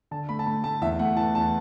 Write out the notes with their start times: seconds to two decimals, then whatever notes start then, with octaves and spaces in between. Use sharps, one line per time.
0.11 D3 A5
0.29 A3 B5
0.39 A5
0.46 A3 B5
0.64 A3 A5
0.81 E2 E5
0.99 A3 F#5
1.17 E3 A5
1.35 E2 A5